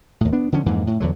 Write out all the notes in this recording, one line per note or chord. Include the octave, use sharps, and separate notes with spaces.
D#2 A2
B3 D4
D3 F3 C#4
F2 G#2 E3 A#3
A2
E2 D3 F#3